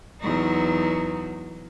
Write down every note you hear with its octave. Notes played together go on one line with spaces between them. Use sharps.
E2 F#3 D#4